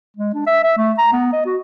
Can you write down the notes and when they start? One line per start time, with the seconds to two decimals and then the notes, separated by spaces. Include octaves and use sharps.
0.17 G#3
0.34 D4
0.46 E5
0.64 E5
0.77 A3
0.98 A#5
1.12 B3
1.33 D#5
1.46 F#4